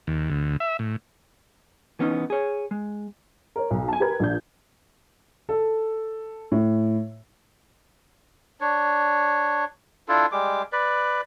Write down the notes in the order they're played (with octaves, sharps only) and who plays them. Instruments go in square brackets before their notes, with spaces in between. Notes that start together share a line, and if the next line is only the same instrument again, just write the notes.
[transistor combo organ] D#2
D2
E5
A2
[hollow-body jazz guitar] E3 B3 C#4 D#4
G#4 C#5
G#3
[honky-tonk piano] A#4 C#5
B1
G#5 A5
G4 A#4 B4 G#6
A#1 D4 G6
[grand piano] A4
A2
[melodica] D4 C#5
D4 E4 F4 A4
G3 G#3 D6
B4 D5